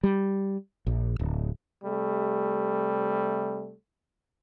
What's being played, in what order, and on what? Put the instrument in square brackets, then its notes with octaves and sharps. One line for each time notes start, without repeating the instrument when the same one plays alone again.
[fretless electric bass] G3
A#1
D1
[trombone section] C3 G3 A3